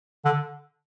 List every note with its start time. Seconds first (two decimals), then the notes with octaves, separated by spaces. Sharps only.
0.25 D3